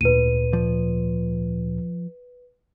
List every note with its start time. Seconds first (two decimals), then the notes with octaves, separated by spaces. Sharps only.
0.01 D2 A#2 B4 D#7
0.53 F3 D5